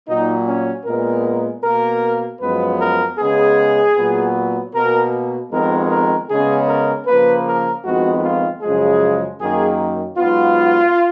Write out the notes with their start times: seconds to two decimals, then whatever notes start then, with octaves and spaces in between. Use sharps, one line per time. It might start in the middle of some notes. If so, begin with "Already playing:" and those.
0.08 A#2 F#3 A#3 D#4
0.47 C#4
0.86 A#2 G#3 B3 A#4
1.63 B2 A#3 A#4
2.41 F#2 F3 G#3 B3 B4
2.80 A#4
3.19 C#3 G#3 B3 G#4
3.97 A#2 F#3 B3
4.74 B2 A#3 A#4
5.52 F2 D#3 G#3 B3 A#4
5.90 A#4
6.30 C#3 G#3 B3 G#4
6.68 A#4
7.07 C#3 F3 A#3 B4
7.46 A#4
7.85 F2 D#3 G#3 B3 F#4
8.23 F4
8.62 F#2 C#3 F3 G#3 G#4
9.40 F#2 D#3 A#3 G#4
10.18 G#2 F#3 B3 F4